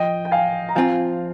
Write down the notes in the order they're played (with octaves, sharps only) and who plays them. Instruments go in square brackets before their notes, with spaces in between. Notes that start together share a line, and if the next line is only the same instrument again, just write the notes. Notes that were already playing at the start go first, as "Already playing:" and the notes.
Already playing: [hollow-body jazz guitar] F3 [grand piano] D#5 G5
[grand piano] G5
F5 G#5
A#5
[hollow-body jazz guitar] F3 C4 F4 [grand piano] F5 G#5